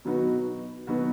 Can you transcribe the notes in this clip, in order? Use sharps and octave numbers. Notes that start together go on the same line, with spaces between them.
B2 F#3 B3 D#4 F#4
B2 F#3 B3 D#4 F#4